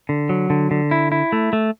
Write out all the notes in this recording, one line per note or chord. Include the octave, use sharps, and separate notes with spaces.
D3
F#3
D3
D3
E4
E4
A3
A3